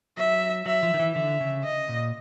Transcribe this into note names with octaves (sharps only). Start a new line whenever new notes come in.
F#3 E5
F#3 E5
F3
D#3
E3
D3 E5
C#3
D#5
A#2